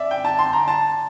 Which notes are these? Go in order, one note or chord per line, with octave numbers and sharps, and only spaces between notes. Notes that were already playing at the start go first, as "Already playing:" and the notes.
Already playing: D5 E5
G5
A5
C6
A#5
A5